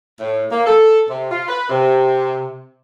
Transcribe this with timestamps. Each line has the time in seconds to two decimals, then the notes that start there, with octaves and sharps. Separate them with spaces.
0.20 A2
0.50 A#3
0.65 A4
1.08 C3
1.30 F4
1.48 B4
1.70 C3